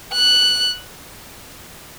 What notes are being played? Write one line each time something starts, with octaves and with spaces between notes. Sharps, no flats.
F#6